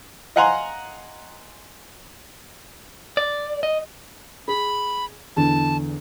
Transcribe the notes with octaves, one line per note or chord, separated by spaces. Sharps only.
D#5 F5 F#5 G#5 A#5 C6
D5
D#5
G#4 B5
E2 D3 A5